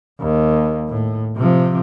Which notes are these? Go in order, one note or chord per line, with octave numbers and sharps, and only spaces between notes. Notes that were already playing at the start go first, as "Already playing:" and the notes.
D#2
A2
C3 F3